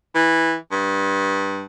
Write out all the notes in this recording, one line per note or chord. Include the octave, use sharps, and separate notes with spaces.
E3
G2